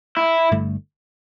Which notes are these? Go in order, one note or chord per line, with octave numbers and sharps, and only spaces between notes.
E4
G1 G2 D3 A3